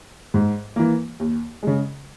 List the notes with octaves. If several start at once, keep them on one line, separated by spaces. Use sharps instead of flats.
G#2
E3 A#3
D#2
C#3 G#3